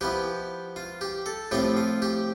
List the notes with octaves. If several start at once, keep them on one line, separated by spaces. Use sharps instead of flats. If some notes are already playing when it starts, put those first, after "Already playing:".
F3 B3 E4 G4
F4
G4
A4
A2 F3 C4 F4 G4
F4
G4